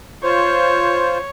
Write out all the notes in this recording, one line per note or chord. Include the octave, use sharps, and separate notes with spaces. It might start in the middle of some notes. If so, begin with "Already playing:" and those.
F4 C5 C#5